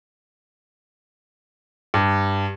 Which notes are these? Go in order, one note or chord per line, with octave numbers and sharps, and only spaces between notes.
G2